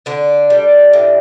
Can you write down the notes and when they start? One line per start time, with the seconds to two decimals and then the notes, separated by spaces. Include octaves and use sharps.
0.06 D3 D4
0.50 G3
0.93 A2